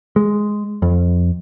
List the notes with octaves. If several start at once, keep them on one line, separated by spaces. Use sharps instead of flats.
G#3
F2